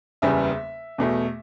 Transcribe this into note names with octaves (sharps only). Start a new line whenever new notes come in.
F#1 E2 C#3 G3 B3 E5
E2 B2 A3